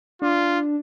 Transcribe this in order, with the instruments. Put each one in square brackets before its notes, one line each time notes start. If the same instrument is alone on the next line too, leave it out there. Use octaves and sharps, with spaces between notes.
[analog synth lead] D4 [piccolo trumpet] F4